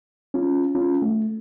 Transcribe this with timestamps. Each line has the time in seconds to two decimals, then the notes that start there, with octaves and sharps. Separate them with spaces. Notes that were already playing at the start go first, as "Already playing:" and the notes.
0.34 C#4 F4
0.75 C#4 F4
1.02 A3